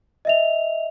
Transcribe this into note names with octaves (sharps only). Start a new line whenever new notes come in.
D#5 E5 F7